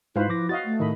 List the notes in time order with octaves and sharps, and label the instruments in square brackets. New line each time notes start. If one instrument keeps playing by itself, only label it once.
[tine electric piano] G#2 F5 [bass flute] E4 [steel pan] F4 B4 C5
[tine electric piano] F3 D6 A#6 [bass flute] E4
[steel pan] F#4 D#5 F5 [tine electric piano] A6
[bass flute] A3
[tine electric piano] A2 D#3 [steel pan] D#5 B5